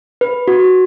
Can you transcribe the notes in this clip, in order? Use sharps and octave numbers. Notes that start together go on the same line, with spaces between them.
B4
F#4